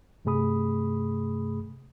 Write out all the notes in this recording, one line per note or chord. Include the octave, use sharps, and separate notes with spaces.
G2 C3 A3 G#4 B5 D#6